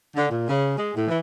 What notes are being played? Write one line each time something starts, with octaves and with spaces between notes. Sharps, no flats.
D3
A#2
C#3
G#3
A2
E3